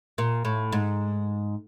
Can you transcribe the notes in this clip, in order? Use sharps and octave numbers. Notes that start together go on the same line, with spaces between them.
A#2
A2
G#2